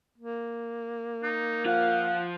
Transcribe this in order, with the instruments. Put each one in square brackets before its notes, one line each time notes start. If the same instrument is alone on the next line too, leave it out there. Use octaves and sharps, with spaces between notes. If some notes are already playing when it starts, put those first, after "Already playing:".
[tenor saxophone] A#3
[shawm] D#4
[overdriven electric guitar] F3 F4 [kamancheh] F5 [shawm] F#5